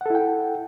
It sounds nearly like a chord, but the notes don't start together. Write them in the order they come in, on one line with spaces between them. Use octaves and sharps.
F#5 A4 E4 G5